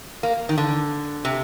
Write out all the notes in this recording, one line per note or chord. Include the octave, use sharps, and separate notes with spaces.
A#3
D#3
D3
C3